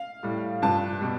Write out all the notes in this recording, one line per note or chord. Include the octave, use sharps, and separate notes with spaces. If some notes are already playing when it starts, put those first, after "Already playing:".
Already playing: F5
A2 G3
G2 F3 A5
B2 G3